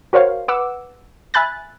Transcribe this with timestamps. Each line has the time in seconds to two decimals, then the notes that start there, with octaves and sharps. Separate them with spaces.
0.13 F#4 A#4 C5 C#5 F5
0.48 B4 F#5 D6 E6
1.34 E5 G#5 B5 F#6 A6